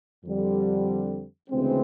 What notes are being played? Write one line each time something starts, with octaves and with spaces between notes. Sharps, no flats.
F2 D3 G3 C4
D2 C#3 E3 G#3 C4